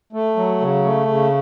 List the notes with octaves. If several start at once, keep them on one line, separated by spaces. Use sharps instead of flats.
A3
F#3
C#3
A3
C#3